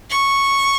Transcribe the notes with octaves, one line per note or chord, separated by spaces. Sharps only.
C#6